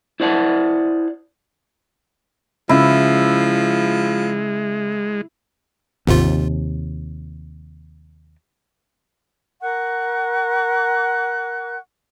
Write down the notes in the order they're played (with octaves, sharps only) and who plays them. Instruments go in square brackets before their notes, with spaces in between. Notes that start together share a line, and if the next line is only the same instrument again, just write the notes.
[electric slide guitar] E4 C5 D5 F#5 A5
[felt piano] C#3 [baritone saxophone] F3 [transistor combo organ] G#3 [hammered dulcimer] E4
[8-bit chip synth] G1 G#2 F4 [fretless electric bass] D#2 C3
[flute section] A#4 F#5 C#6 F#6